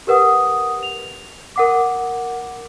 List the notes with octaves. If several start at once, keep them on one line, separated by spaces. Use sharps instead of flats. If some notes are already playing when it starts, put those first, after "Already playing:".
G4 A#4 B4 F#5 D#6
F7
A#4 F#5 D6